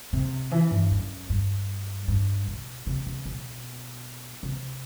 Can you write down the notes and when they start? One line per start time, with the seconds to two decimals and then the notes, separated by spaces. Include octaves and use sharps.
0.13 C3
0.51 E3
0.71 G2
0.91 F#2
1.30 G2
2.08 G2
2.48 B2
2.87 C3
3.06 C3
3.26 B2
4.43 C3